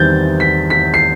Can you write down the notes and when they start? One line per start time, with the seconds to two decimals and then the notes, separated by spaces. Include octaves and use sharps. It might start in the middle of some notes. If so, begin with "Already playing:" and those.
Already playing: E2 D#3 G3 C4 G6 A6
0.40 B6
0.70 B6
0.94 C7